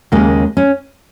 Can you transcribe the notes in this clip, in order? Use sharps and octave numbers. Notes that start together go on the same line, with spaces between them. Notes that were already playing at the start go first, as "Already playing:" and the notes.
D#2 C#3 G#3 A#3
C#4